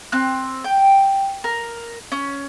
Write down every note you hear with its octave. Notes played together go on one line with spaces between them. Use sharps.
C4 F#6
G5
A#4
C#4